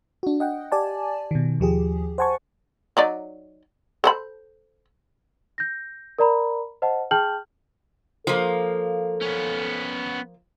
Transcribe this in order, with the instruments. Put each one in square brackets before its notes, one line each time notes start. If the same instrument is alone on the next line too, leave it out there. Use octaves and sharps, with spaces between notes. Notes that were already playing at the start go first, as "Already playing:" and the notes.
[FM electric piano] D4 F#4
D#5 F#5 G5
G4 D5 G#5 A5
B2 D#3
D#2 F3 G4 G#4
C5 F#5 G#5 A5 C#6
[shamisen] F#3 D#4 D5
A4 C5 B5
[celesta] G6 A#6
A#4 D5 A#5 B5
C5 D#5 F#5 A5
G#4 G5 A5 F6 G6 F#7
[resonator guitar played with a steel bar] F3 A#3 [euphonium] A4
[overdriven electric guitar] B3 C#4